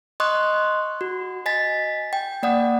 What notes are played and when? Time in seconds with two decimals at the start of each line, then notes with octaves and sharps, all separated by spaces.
0.20 D#5 C6 C#6 D#6 F#6
1.01 F#4
1.46 D#5 G#5 A6 B6
2.13 G5
2.43 A#3 D5 F#5 D#6